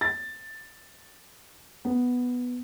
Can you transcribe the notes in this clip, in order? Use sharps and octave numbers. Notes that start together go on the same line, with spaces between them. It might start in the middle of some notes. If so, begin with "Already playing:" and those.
A6
B3